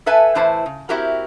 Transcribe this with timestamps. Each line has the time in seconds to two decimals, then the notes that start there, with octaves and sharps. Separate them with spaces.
0.06 A4 B4 E5 G#5 A5
0.35 A2 E3 E4 B4 C5 A5
0.66 C#3
0.89 C4 E4 F#4 G4 A#4